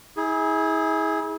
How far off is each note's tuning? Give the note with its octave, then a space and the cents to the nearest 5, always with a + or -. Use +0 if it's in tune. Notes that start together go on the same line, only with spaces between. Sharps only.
E4 -40 G#4 +0